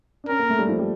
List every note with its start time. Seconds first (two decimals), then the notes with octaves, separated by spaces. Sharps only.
0.24 D4
0.29 C#4 A#4
0.39 A#3
0.50 A3
0.59 G3
0.69 F3
0.79 G3